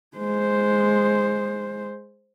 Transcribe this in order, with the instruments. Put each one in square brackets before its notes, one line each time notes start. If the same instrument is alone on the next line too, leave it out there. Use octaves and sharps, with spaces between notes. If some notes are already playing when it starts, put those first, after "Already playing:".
[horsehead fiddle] G#3 C5